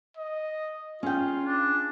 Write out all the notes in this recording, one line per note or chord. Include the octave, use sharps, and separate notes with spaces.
D#5
C#4 F4 G#4 G5
D4